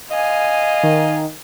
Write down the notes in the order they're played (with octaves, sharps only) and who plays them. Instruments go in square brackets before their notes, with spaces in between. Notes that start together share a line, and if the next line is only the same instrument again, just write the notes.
[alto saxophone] D#5 [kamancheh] F5 G#5
[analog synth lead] D#3